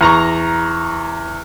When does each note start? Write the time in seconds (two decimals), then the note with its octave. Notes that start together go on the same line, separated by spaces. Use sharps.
0.01 E2 A#5 C#6